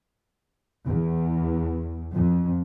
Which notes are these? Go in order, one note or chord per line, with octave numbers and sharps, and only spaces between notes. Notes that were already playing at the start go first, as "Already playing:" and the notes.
E2
F2